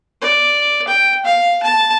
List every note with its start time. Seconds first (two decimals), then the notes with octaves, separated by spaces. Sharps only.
0.21 D5
0.88 G5
1.25 F5
1.63 A5